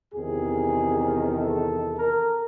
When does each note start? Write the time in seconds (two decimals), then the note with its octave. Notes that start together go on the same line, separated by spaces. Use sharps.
0.14 E2 C3 D#3 G#4
1.37 A4
1.98 A#4